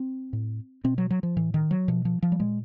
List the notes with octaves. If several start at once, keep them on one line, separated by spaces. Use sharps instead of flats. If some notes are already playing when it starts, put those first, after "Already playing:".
Already playing: C4
A2
B2 C4
F#3
F#3
F3
A2 E3
D#3
F#3
B2 F3
F3
F3
G3
A#2 G#3